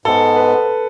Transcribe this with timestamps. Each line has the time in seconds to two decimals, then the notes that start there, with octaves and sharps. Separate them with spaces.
0.05 G#2 G#3 B3 A4
0.36 B4